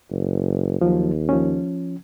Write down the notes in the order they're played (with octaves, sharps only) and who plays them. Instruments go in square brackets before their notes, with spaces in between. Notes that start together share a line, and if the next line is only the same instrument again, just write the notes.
[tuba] F#1
[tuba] D#2 [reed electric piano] F3 F#3
[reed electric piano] F3 C#4